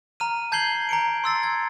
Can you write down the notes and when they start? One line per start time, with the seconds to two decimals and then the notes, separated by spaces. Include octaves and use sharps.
0.20 A#5 F6 D#7
0.52 A5 G6 G#6 C7 F#7 G7
0.89 A#5 C#7 D7
1.24 C6 E6 A6 C7
1.43 G#6